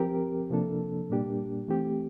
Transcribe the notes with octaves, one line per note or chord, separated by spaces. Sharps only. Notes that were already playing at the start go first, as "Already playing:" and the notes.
Already playing: F3 C4 G4 A#4
C3 F3 A#3 D4 A4
A#2 G3 A#3 D4 G4
E3 A3 C4 G4